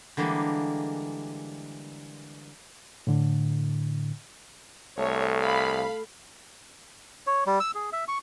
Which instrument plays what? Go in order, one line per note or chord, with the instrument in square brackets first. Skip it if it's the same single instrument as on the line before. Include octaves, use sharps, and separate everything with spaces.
[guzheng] D3 E3 G3 G#3 A#3
[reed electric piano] A2 D3
[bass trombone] C2 [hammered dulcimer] A3 [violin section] C#5
[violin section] F5 B5
[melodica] C#5
G3
E6
G#4
E5
C#6